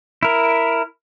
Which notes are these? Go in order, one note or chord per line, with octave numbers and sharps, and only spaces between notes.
E4 A#4